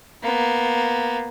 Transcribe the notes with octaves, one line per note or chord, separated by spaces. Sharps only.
A#3 B3